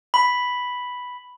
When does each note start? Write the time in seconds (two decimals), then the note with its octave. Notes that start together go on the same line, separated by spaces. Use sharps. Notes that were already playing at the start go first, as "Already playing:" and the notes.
0.14 B5